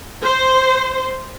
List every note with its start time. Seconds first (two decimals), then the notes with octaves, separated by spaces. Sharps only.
0.24 C5